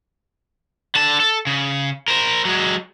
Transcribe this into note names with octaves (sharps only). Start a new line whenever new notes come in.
D3 A5
A4
C#3
A#4 C5
F#3 G#3